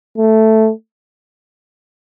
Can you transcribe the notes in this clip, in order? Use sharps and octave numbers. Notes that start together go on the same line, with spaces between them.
A3